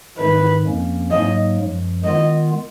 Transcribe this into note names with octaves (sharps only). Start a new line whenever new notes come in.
G#2 D#3 G#3 B4
F2 F3 A#3 C#4
G#2 F#3 A#3 D#5
F#2 F3 G#3
D#3 G#3 B3 F4 D#5